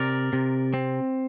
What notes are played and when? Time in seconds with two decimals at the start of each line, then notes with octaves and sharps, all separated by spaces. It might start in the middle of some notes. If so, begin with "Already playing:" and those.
Already playing: C3 A#4 D5
0.33 C3
0.74 C4